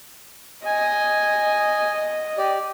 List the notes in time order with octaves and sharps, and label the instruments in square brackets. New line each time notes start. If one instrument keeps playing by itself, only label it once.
[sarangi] D#5 [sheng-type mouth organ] G#5
[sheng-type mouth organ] G4 D5